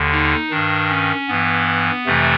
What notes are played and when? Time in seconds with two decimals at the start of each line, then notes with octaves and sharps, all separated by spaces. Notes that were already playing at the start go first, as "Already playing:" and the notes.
Already playing: D#2 D3
0.11 D#4
0.51 G2 D#3 D4
0.89 C#4
1.28 G2 E3 B3
2.06 F2 C3 E3 A3